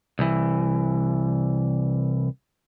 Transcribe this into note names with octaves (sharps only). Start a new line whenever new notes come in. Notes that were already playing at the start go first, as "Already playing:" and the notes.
C2 E3